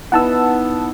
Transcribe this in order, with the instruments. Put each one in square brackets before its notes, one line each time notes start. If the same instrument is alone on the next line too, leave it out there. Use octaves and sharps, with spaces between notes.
[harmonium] B3 [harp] D#4 E4 [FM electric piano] F#5 A5 E6